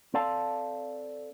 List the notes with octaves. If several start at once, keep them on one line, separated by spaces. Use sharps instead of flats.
C4 A4 D5 F5 A5